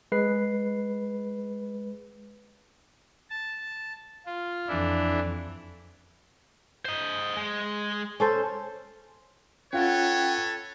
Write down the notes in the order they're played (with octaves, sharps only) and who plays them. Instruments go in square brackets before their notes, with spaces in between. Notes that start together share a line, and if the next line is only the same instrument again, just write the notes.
[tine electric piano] G#3 B4 C7
[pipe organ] A5
F4
[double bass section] F2 [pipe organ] E3 D4 E4
[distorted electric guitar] C5 D#5
G#3
[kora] C#4 A4 C5
[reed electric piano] C#4 F4 F#5 [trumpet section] A4 B4 C#5 [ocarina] G5